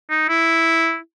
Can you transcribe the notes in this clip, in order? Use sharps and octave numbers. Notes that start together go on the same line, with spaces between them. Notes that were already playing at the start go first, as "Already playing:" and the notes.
D#4
E4